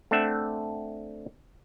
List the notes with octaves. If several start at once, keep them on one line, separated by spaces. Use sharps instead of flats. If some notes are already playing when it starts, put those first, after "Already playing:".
A3 C4 D4 E5 F#5